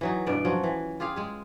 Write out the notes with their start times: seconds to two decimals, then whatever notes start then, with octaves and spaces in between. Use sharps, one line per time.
0.01 E3 F#3 D#4
0.26 G2 B2 B3 D5
0.45 F3 F#3 C#4
0.64 E3
1.00 F4 G4 G#4 F5
1.16 G#3 G#4